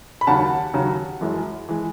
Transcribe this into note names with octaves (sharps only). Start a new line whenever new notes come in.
B5
D#2 C#3 F#3 F#5 A5
D#2 C#3 F#3
F#2 E3 G#3
E3 G#3